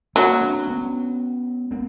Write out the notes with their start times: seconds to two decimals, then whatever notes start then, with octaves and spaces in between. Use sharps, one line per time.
0.15 F#3 A#3 C4
0.41 C4 D4
0.67 B3 C#4
1.71 A#3 C4